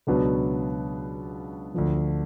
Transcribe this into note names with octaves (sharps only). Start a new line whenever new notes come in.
C#2 B2 F#3 B3 D4
D2 D3 F3